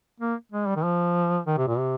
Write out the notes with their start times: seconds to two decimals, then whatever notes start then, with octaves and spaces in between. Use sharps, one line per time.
0.20 A#3
0.52 G#3
0.67 G3
0.76 D#3
0.84 F3
1.46 D#3
1.58 C3
1.68 A#2
1.78 C3